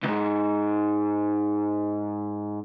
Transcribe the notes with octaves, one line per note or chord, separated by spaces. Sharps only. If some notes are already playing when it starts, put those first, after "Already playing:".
C#2 G#2